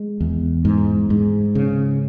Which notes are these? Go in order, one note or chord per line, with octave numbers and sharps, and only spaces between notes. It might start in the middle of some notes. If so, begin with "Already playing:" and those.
Already playing: G#3
E2
G#2
G#2
C#3